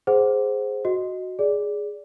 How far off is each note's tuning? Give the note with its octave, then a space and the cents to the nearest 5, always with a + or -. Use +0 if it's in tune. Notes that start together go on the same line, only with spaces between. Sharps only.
G#4 +0 C5 +0 F#5 +0
F#4 +0 D#5 +0
G#4 +0 D5 -20